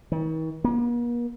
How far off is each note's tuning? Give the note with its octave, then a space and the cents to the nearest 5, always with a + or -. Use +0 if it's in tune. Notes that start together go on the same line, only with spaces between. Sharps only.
D#3 +45
A#3 +45